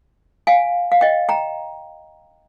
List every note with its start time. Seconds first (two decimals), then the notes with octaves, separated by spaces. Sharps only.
0.47 F5 G#5
0.92 F5
1.01 D#5 G5
1.29 G5 A#5